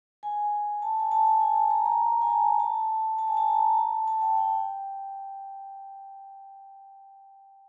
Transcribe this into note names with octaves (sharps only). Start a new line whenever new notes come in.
G#5
A5
G#5
A5
G#5
A5
A#5
A#5
G#5
A5
A5
A5
G#5
A5
A#5
A5
A5
G5
G5